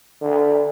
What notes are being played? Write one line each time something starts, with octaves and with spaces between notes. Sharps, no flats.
D3